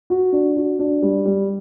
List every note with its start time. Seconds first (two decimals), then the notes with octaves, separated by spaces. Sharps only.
0.10 F#4
0.32 D4
0.57 F#4
0.79 D4
1.02 G3
1.25 G3